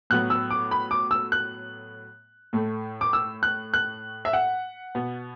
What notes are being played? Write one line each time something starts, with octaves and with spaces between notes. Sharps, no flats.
A2 F#3 B3 F#6
E6
D6
B5
D6
E6
F#6
A2 A3
D6
E6
F#6
F#6
E5
F#5
B2 B3